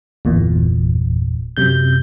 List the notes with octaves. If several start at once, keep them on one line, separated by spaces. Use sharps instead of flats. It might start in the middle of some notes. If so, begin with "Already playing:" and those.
G1 E2 A#2
F#2 C3 G6